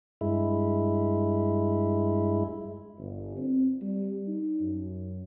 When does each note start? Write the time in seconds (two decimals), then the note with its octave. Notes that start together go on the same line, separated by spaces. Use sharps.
0.21 G2 G#3 E4
2.99 G1
3.37 C4
3.82 G3
4.28 D#4
4.60 F#2